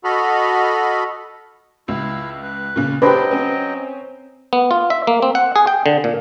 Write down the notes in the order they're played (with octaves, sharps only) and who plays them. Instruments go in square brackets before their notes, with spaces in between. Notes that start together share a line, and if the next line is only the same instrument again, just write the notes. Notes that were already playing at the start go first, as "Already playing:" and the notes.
[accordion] F#4 A4 D#5 B5 F6
[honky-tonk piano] C#2 [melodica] E4 E6
[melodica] B4
[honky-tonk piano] A#2 C#3
[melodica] F#3 D#5 G5 [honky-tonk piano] D4 G4 [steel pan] B4 C5
[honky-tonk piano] C4 C#4
[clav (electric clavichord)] B3
F4
E5
A#3
C4
F#5
G#4
G5
D3
A#2